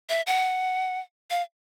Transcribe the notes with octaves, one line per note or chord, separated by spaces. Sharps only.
E5
F#5
F5